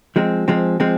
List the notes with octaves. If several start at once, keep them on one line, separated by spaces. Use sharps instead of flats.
F3 G#3 C4
F3 G#3 C4
F3 G#3 C4